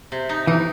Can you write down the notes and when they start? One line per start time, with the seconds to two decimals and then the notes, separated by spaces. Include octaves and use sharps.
0.12 C3
0.29 D#4
0.47 E3 D#4